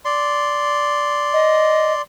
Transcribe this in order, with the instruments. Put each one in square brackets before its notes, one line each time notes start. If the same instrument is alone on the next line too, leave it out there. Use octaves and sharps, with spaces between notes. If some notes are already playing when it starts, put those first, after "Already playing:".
[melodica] D5 C6
[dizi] D#5